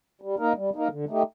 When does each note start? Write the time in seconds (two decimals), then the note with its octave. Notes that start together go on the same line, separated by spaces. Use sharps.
0.22 G3
0.39 A#3 D#4 A#4
0.56 G3
0.74 A#3 D#4 A#4
0.91 D3
1.09 A3 D#4 G4